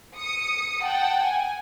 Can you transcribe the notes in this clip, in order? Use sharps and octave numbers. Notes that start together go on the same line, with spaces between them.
D#6 C#7
F#5 G5 A5
G#5